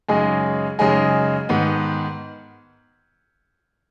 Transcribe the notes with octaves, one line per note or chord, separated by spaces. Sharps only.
F#2 C#3 G#3 D#4 G#4
F#2 C#3 G#3 D#4 G#4
G#2 D#3 B3